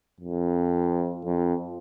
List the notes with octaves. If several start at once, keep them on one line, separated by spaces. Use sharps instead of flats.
F2
F2